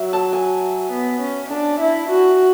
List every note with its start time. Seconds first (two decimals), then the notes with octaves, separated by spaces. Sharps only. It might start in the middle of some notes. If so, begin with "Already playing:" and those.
Already playing: F#3 E5
0.13 A5
0.33 G#5
0.92 B3
1.21 C#4
1.51 D4 A5
1.80 E4
2.10 F#4